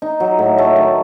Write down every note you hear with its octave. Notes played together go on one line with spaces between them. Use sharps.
D#4
F#3
A2
A3
D#3